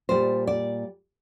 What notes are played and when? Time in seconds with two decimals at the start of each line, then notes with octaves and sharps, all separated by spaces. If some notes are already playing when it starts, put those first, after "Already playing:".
0.09 A#2 G3 C5
0.47 D5